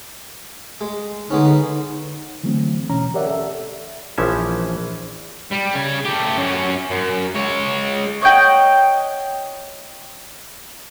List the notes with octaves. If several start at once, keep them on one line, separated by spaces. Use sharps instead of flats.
G#3
D3 G#3 B3 C#4 D#4
D3 E3 F#3 A3 C4
B2 E3 C#4 A#5
G4 A#4 C#5 D5 E5 F#5
A4 E5
A#1 E3 F3 C#4 E5
G3
C#3 G#5
A3 G4
F#2 C#4
F#2
G#3 C#5
C#5 D#5 F#5 G5